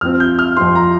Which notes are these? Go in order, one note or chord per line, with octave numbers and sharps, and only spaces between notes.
F2 F3 C4 F6
G6
F6
F2 F3 C4 C6
A#5